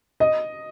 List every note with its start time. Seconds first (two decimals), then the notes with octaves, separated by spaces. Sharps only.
0.20 D#5